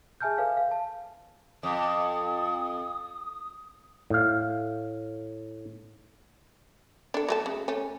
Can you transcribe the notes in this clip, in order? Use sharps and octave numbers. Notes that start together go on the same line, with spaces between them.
G#4 E5 G#5 A5 F6 G6
A4 B4 C#5 F5
F5
A5
F2 D#6
A2 F5
D4 A4
F#3 A3 A5
C#3
A3 C#4